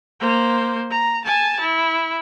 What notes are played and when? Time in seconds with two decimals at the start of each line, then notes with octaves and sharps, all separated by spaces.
0.20 A#3 C5
0.90 A#5
1.25 G#5 A5
1.60 E4